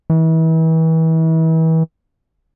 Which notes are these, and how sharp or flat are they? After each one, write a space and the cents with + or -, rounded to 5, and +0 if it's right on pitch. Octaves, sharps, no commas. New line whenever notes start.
E3 -35